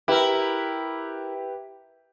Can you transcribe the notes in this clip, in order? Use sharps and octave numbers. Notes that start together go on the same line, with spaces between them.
E4 G4 A#4 B4 E5